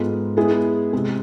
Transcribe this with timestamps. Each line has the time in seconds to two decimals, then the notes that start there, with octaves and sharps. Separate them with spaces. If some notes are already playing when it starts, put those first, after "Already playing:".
Already playing: G#2 G#3 B3 F4 A4
0.37 G#3 B3 E4 G#4
0.93 C3 G#3 C4